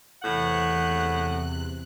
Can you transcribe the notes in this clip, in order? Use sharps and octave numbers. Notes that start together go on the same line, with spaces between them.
E2 A2 C3 F#5 F#6